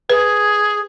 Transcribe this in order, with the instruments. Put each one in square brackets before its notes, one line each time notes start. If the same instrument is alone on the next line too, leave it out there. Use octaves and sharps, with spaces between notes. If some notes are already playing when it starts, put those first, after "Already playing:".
[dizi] G#4 [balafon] B4